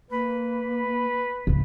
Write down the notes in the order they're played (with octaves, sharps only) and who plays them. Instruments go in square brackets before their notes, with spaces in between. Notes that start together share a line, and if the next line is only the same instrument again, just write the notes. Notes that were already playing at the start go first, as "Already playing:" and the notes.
[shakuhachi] A#3 [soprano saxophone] B4
[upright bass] C#2 G#2